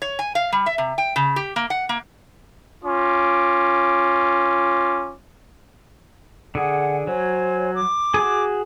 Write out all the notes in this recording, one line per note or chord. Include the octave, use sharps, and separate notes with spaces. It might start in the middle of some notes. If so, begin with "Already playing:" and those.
C#5
G#5
F5
G3
E5
C3
G5
C#3
G4
A#3
F#5
A#3
C#4 F4 D6
D3 G#4 F#5
F#3 C5 C#5 G#5
D6
F#4 G#4